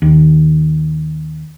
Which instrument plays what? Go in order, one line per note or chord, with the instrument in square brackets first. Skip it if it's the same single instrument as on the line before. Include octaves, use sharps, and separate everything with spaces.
[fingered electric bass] D#2